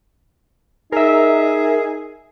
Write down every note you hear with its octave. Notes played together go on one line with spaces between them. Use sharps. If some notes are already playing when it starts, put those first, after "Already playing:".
D#4 G#4 A#4 E5